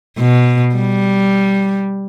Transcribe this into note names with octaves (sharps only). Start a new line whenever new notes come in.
B2
G3